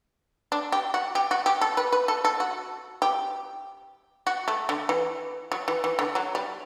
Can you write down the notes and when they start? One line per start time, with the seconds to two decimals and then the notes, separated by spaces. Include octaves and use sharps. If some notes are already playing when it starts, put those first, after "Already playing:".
0.52 D4
0.72 G4
0.94 F#4
1.15 G4
1.31 F#4
1.46 G4
1.61 A4
1.77 B4
1.92 B4
2.08 A4
2.25 A4
2.40 F#4
3.02 G4
4.27 F#4
4.48 A3
4.69 D3
4.89 E3
5.52 F#3
5.68 E3
5.84 E3
5.99 D3
6.15 F#3
6.35 G3